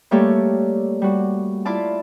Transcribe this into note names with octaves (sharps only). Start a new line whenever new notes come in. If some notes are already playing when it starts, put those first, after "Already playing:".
G3 A3 A#3 G4 A4 C#5
G3 F#4
E4 F4 D5 A5